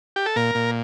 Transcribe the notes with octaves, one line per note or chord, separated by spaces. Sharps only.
G4
A4
A#2 A#4
A#2